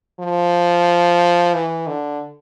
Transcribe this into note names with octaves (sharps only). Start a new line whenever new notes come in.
F3
E3
D3